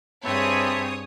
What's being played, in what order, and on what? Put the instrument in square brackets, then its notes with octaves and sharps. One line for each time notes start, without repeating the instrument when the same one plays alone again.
[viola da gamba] G2 G#4 [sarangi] C4 [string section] C#5 D#6 [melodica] E5 A5 B5